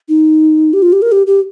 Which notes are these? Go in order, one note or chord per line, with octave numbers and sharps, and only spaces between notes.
D#4
G4
F4
G4
A#4
G4
G4